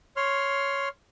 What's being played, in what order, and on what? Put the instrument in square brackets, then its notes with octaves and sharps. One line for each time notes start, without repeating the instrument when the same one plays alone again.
[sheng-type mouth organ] C#5 C6 F6